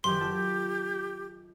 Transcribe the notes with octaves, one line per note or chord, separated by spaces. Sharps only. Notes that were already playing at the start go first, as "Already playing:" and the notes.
F#1 D#3 G4 C6
F4 A4 A5